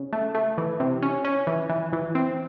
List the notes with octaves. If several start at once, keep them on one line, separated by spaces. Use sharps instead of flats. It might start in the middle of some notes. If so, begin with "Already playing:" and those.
Already playing: C#3
A3
A3
E3
C3
C#4
C#4
E3
E3
E3
C4